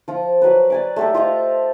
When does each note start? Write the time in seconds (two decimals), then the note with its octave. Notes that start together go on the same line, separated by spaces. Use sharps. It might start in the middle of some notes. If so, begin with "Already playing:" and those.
0.08 F3 F4
0.42 F#3 B4
0.70 D5 G#5 D6
0.96 A3 G4 A4
1.14 F4 C5 D#5 F5